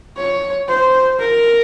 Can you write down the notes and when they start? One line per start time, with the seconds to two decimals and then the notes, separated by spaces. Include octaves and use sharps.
0.17 C#5
0.69 C5
1.19 A#4